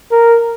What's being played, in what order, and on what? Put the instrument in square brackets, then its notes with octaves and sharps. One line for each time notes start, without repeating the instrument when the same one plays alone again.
[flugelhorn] A#4